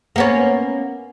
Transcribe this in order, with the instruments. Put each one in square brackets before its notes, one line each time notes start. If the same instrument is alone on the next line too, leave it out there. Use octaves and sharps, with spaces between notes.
[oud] A#3 B3 C#4